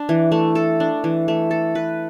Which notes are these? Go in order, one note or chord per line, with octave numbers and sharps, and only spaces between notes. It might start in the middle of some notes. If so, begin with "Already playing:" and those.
Already playing: D4
E3
A3
A4
D4
E3
A3
A4
B4